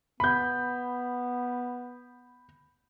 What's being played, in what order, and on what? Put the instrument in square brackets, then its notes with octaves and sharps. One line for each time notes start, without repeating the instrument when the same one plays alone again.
[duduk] B3 [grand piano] B5 G6